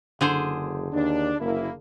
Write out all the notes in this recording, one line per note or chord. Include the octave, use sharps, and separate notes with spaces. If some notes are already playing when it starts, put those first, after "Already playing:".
F#1 D3 G#4 C5
D#2 D4
F#1 A#3 E4